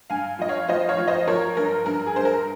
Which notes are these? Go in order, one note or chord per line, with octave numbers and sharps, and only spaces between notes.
G2 F5 G#5
F3 D#5
C#5 F5
F3 C5 D#5
C#5 F5
F3
C5 D#5
F3 A#4 C#5
G2 A#4
G2 A#4
G#4
G2 C5
A#4